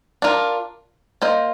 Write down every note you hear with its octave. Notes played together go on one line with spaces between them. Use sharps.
D4 F4 A#4
A#3 F4 C5 D#5